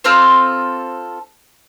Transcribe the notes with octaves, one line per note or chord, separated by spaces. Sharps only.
C4 F4 A4 C5